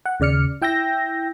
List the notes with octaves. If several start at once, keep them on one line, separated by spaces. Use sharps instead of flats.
F#5
D#2 C#3 D5 F6 C#7
E4 G5 E6 G6 A#6